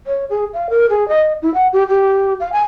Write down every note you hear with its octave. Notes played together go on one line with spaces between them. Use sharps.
C#5
G#4
F5
A#4
G#4
D#5
E4
F#5
G4
G4
F5
G#5